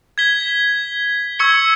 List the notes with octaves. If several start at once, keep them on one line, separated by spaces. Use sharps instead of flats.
G#6 B6 G7
C#6 E6 G#6 C#7 G7